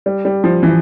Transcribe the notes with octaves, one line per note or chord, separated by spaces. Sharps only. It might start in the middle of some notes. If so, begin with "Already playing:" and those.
G3
G3
F3
E3